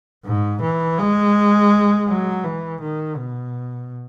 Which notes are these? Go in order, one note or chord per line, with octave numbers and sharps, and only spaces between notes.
G#2
E3
G#3
F#3
E3
D#3
B2